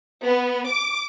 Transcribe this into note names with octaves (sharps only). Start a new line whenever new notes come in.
B3
D6